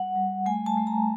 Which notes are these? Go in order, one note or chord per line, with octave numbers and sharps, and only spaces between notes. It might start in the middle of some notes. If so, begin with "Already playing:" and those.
Already playing: G3 F#5
G3
A3 G#5
A5
A3
A#5